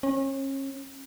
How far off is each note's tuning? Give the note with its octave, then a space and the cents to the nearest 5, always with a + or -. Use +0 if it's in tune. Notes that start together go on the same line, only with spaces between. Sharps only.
C#4 -35